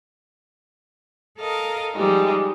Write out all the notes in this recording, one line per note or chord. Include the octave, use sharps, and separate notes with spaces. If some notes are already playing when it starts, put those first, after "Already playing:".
A4 A#4 D#5 F5
F3 G3 G#3 D#4